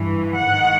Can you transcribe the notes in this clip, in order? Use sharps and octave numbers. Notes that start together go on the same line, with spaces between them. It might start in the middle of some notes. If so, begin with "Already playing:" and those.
Already playing: G2 E3
G#2 D#3 F#5